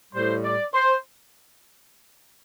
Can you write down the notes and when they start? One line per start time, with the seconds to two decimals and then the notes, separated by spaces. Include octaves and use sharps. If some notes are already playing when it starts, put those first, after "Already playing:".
0.13 A2 G3 C5
0.43 D5
0.74 C5